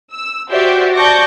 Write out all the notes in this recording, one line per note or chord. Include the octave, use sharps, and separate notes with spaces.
E6
F#4 G4 C5 D5 E5 G5
D5 A5 C#6 D6 G6 A#6